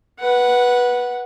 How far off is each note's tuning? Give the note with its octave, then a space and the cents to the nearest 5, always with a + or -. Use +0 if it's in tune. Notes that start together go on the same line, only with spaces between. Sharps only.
B4 -15 F#5 +0